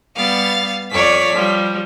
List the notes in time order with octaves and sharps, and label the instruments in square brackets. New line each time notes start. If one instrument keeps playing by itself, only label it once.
[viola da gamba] G3 B3 [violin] F5 A6
[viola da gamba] F2 C#5 D5 [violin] B6
[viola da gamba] F3 G3